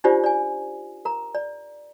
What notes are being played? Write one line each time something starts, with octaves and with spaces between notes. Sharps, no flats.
D4 D#4 F4 G4 C5 D5
D5 G#5
A#4 A#5
D5